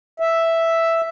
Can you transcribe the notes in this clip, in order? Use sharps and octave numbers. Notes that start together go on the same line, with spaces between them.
E5